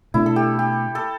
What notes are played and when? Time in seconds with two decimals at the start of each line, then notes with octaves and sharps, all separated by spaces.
0.14 B2 A3 D4 E4
0.26 A4
0.36 G4
0.59 G4
0.95 A4